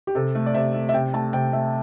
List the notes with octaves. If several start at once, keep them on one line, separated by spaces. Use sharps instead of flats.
G4
C3 A4
A3
D5
C3 E5
A3
E5
C3 G5
A3 A5
C3 G5
A3 E5